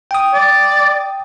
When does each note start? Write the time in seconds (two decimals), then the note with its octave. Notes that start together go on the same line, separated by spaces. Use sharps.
0.11 G5 D#6
0.34 D5